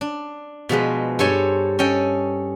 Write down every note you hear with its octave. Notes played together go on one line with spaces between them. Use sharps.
D4
B2 F3 G#3 B4
G2 A4 C5 C#5 G#5 C6
C#4 A4 D#5 G5